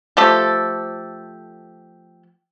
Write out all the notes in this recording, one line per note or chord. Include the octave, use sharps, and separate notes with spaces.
F3 A3 G4 A4